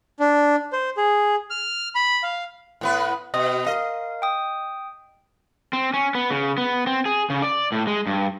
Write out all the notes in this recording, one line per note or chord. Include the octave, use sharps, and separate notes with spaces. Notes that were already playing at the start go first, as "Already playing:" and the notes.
D4
C5
G#4
F6
B5
F5
A2 B3 B4
B2 D#5 D#6
A#4 D#5 F5
G5 D#6
C4
C#4
B3
C#3
B3
C4
G#4
C#3
D5
A2
G#3
G2